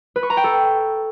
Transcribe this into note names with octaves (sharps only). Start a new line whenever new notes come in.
B4
C#6
A#5
G5
A4